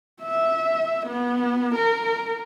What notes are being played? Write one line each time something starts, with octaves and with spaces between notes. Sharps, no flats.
E5
B3
A#4